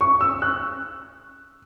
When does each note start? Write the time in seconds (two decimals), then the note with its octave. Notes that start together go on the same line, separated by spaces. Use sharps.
0.01 C#6
0.21 E6
0.42 F#6